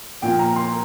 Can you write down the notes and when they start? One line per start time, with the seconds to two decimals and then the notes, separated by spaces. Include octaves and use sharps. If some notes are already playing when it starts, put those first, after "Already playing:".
0.22 A#2 F3 A#3 G5
0.39 A#5
0.56 C6